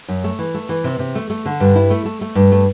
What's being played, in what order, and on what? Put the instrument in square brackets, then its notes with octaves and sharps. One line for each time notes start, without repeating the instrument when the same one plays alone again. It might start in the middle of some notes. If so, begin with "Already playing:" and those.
[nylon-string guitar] F#2
A3
E3
A3
E3
C3
C3
A3
A3
D3
G2
E4
A3
A3
A3
G2
A3